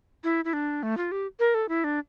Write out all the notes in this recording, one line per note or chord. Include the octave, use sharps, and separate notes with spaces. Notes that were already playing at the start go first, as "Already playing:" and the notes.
E4
E4
D4
A3
F4
G4
A#4
A4
E4
D4